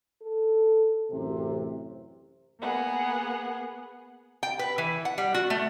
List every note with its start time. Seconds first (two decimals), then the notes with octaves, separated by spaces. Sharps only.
0.22 A4
1.11 A1 F#2 C3
2.60 A#3 B3 G#4 F#5
4.43 G5
4.59 B4
4.78 E3
5.05 F#5
5.18 G3
5.34 F#4
5.50 A3